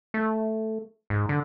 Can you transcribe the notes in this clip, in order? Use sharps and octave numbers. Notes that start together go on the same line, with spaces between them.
A3
G#2
D3